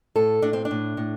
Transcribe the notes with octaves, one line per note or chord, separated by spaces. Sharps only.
A2 A4
A2 D4
C4
D4
A2
A2